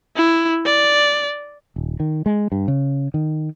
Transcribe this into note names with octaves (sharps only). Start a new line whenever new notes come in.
E4
D5
D#1
D#3
G#3
G2
C#3
D#3